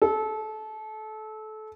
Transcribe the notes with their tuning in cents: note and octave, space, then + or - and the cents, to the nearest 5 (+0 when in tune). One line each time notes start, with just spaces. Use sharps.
A4 -25